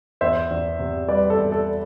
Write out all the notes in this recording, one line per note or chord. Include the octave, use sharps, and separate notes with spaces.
E2 C5 E5
E2
C3
G3 B4 D5
A4
E2
A4